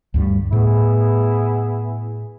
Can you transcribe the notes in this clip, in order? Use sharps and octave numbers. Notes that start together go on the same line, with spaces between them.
D2 G2 G3
A2 B3 E4 G#4